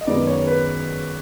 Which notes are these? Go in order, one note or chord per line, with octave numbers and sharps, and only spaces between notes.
D#5
F#2 D#3 G#3 B3 D5
C#5
B4